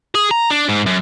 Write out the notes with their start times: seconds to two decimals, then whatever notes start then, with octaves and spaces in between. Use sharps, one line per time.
0.15 G#4
0.31 A#5
0.51 D4
0.69 G#2
0.86 F#2